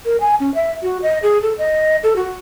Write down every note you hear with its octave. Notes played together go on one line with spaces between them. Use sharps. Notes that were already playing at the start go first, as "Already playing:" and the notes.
A#4
G#5
C#4
E5
F#4
D#5
G#4
A4
D#5
A4
F#4